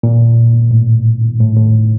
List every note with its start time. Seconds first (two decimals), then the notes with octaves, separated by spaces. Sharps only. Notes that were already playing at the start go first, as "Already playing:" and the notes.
0.03 A#2
0.71 A2
1.40 A2
1.56 A2